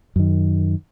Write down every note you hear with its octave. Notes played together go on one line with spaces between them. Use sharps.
F#2 D#3